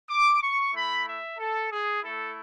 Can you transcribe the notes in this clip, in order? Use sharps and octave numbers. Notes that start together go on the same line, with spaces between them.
D6
C#6
A3 E4 B5
E5
A4
G#4
A3 E4 A4